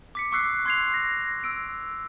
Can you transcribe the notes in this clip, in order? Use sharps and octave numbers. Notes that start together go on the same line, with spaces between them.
D6 B6 C#7
C#6 D6 E6 F#6 C7
C6 G#6 C7 F7
A#6
E6 D7